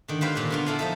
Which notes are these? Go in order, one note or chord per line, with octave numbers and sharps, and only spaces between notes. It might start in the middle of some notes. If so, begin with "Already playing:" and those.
D3 D#3
G3 F4 B4 C5 F5
A#2 C#5 G#5
D3 B3 F4
E4 A4 D5 F5
F3 D#4 A4